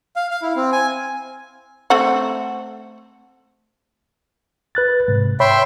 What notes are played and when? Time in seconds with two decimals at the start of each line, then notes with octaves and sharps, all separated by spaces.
0.16 F5
0.31 F5
0.42 E4
0.56 C4
0.72 G#5
1.90 A3 C4 F#5
4.75 B4 F#6 A6
5.08 G#2 C3
5.40 C#5 E5 G5 B5 C6